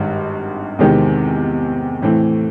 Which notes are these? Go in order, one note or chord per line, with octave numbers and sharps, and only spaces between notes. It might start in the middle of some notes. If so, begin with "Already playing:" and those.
Already playing: G#1 G2 D#3 G#3
E2 C3 D#3 G#3 C4
A2 E3 A3 C4